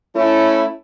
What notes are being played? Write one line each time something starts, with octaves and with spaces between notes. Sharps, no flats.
A3 C#4 E4